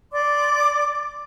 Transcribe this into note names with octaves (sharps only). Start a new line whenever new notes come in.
D5 C6 D6